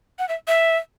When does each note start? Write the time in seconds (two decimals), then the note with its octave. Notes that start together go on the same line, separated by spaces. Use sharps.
0.19 F#5
0.29 E5
0.48 E5